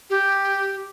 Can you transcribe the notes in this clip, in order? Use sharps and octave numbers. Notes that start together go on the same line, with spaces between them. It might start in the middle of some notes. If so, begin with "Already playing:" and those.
G4